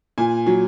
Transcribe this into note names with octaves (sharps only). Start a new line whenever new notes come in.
A#2 G#5
F#3